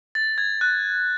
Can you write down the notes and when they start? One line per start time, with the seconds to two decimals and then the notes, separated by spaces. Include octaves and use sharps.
0.15 A6
0.38 G#6
0.61 F#6